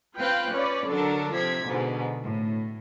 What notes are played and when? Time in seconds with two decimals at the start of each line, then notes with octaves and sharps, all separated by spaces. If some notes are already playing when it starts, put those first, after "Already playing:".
0.19 C4 F4 B4 F5 G5 F#6
0.51 C#4 B4 C#5 D5
0.89 D3 F#3 D4 A4 A#4
1.33 C3 F3 C4 G#6 B6
1.66 G#2 B2 D3
2.23 A2